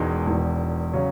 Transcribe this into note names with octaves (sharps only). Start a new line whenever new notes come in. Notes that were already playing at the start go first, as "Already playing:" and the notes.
Already playing: E1 E2 D#3 G#3 D#4
E1 E2 D#3
C#3 F#3 C#4